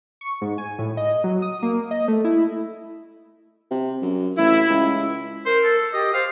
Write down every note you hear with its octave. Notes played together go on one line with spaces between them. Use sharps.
C#6
G#2
G#5
A2
D#5
F#3
D#6
A#3
D#5
A3
E4
C3
F#2
A1 E4
C#2
A#4 C5
A4
G4 D#5
C5 F5